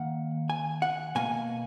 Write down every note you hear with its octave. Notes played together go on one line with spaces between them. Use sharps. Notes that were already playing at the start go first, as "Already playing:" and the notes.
Already playing: D#3 A#3 F#5
G#5
F#5
B2 A#3 G#5